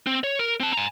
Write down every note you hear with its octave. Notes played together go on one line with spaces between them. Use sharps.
C4
C#5
A#4
C4 A5
G#5 A#5